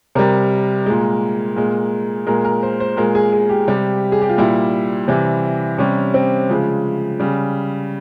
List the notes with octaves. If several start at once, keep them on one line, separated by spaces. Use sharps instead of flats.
C3 G3 A#4
A#2 G#3
A#2 G#3
A#2 G#3 A#4
A#4
C5
C5
A#2 G#3 A#4
G#4
G#4
G4
C3 G3
G#4
G4
F4
A#2 G3 E4
C3 E3 G3
C3 G3 C#4
C4
C#3 F3 G#3
C#3 G3